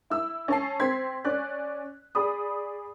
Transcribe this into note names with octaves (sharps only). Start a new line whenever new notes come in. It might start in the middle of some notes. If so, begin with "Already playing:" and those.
E4 E6
C#4 A5 C7
C4 C6 G#6 B6
C#4 D5 F#6
G#4 D5 B5 D#6